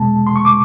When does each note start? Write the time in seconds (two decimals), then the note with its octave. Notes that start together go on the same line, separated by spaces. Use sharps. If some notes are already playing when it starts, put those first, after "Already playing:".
Already playing: E2 B2 G#3 A5
0.27 C6
0.36 C#6
0.45 D6